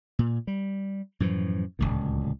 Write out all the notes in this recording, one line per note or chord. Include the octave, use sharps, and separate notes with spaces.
A#2
G3
F#2 A2 E3 F3
D1 G1 C#2 A#2